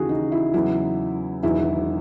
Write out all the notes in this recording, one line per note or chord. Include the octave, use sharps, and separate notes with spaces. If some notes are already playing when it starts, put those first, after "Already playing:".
Already playing: D#2 C#3 E3 F#4 G#4
D#4
E4
E2 C#3 F#3 E4
E1 E2 D#3 F#3 E4